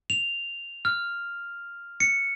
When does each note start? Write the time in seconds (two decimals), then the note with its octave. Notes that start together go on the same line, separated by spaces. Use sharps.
0.10 F7
0.85 F6
2.00 C#7